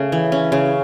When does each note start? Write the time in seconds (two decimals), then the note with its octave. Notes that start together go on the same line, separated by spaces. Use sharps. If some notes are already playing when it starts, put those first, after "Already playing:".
Already playing: C#3 A3
0.12 E3
0.32 C#4
0.52 C#3